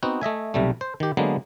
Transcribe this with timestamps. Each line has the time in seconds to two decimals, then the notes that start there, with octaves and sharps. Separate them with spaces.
0.03 B3 C4 D#4 F#4
0.21 A3 D#5 E5 G#5
0.54 B1 C3 G3 A3
0.81 C5
1.00 D#3 G4
1.17 D3 F#3 G#3 A#3 B3